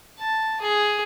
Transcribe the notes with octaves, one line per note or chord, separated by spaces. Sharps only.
A5
G#4